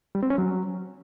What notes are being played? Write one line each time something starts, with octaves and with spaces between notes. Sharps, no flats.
G3
C4
C#4
F#3